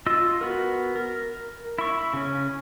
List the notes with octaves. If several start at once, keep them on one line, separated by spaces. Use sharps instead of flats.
F4 D#5 E6
B3 F#4 A#4
A#4
E4 C#6
C#3 C#4